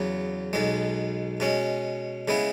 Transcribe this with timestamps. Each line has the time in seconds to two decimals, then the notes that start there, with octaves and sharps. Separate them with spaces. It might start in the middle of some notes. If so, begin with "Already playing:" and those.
Already playing: E2 C#3 F#3 B3
0.53 B1 B2 G#3
1.40 B2 G#3 C#4
2.28 C#3 G#3 B3 E4